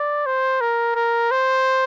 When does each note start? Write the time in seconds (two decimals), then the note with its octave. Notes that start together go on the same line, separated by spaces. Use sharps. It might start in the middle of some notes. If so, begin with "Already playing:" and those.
Already playing: D5
0.26 C5
0.61 A#4
0.95 A#4
1.31 C5